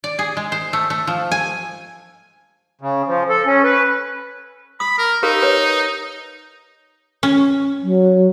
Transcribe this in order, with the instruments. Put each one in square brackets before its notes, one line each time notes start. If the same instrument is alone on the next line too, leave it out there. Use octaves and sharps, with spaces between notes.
[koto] D5
G#4
G#3
C5
A3
A3
F3
G#5
[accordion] C#3
F3
A4
C#4
B4
[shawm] B5 [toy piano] D#6
[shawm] A#4
[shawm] D#4 [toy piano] G4 A#4 F5
[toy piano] B4 C#5
[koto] C#4
[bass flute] F#3